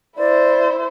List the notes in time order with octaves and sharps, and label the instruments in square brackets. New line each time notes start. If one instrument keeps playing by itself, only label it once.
[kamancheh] E4 C5 [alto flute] D5